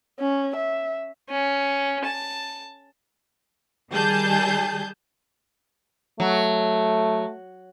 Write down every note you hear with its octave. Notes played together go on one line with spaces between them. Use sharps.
C#4
E5
C#4
A5
D#3 G3 G#4 A5 G6
F#3 A3